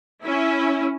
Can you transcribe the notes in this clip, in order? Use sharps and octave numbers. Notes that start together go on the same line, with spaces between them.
C#4 E4